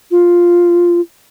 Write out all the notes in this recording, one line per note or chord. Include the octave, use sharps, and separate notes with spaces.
F4